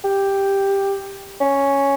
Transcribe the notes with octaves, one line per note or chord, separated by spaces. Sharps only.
G4
C#4